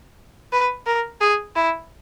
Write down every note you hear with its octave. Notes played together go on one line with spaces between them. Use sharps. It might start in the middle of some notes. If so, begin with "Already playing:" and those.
B4
A#4
G#4
E4